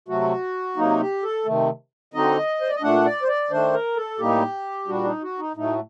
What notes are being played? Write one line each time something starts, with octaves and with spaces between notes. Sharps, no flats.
C3 F#3 A3 F#4
C3 F#3 A#3 D#4
G4
A4
C3 D#3 A3
D3 F#3 C4 D#4 D#5
C5
D5
D#5
A#2 A3 D4 F#5
D5
C5
D5
D#3 A3 D4 C5
A#4
A4
A2 G3 A#3 D#4 G4
A#2 G3 D4 F#4
D#4
F#4
D#4
A2 F#3 A3 D#4